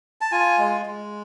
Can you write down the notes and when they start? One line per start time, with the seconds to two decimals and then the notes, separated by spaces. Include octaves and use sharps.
0.21 A5
0.32 F4 G#5
0.59 G#3
0.86 G#3